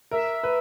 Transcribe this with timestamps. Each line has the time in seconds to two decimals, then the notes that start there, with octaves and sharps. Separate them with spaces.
0.11 A#4 E5
0.43 B4